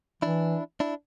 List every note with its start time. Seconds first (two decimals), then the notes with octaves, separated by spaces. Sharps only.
0.22 E3 D4 E4
0.80 D4 E4